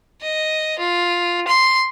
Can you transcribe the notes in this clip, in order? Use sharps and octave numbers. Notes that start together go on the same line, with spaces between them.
D#5
F4
C6